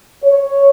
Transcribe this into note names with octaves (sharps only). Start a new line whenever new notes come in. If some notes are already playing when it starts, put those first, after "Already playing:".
C#5